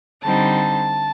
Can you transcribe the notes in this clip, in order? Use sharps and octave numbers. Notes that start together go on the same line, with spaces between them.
D3 G3 C4 D#4 A5